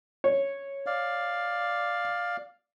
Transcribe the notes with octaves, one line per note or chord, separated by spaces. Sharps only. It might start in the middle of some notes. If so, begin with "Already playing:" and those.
C#5
D5 F5